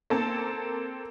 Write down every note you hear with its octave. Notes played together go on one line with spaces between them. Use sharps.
A#3 C4 A4 A5